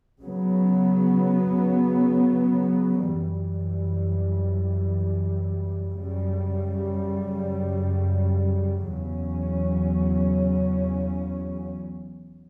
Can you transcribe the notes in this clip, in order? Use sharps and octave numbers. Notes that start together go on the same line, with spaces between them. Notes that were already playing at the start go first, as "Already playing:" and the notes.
C#3 F#3 B3
F#2 E3 G3
F#2 C#3 G3
E2 C#3 F#3 C#4